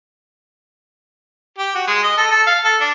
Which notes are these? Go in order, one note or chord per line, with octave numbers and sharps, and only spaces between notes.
G4
F#4
G#3
D#5
A4
A4
F5
A4
D4